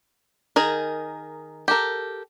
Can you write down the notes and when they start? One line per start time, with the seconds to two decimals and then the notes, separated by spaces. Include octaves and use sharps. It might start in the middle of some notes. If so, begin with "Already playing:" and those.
0.56 D#3 G#4 A#4
1.68 G4 A4 A#4